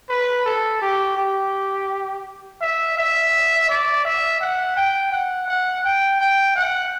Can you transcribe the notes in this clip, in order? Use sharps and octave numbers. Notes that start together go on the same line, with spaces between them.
B4
A4
G4
G4
E5
E5
D5
E5
F#5
G5
F#5
F#5
G5
G5
F#5